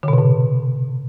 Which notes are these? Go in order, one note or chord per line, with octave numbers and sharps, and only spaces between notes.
D3
B2
C3
A2